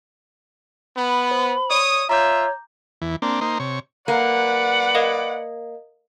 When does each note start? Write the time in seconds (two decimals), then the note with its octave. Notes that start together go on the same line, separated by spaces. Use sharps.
0.97 B3 B5
1.31 C5
1.71 C#5 D5 D#6
2.09 F4 C#5 E5 A#5 D6 G6
3.02 E2 E3
3.22 A#3 C4 D4
3.41 A#3 D#4 C5
3.60 C3 C#5
4.08 A#3 B4 D5 F#5
4.95 A#4 D#5 F5